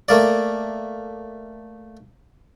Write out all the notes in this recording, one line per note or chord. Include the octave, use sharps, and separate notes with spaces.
A3 A#3 D5